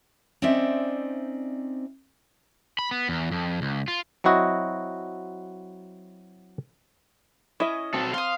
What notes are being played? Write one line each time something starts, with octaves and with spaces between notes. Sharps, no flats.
C4 C#4 D#4 C5 D5 E5
B5
B3
E2
F2
C#2
F4
F#3 C4 E4 F#4 D#5
C#4 E4 D#5 E5
B2 C4 A4
F5 C6 D#6